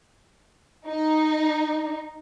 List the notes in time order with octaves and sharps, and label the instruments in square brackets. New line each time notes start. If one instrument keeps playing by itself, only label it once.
[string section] D#4